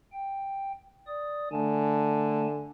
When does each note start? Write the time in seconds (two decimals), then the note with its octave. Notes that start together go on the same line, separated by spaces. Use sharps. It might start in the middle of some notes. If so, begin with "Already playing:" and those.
0.12 G5
1.07 D5 D#6
1.52 D3 A3 G#5 A5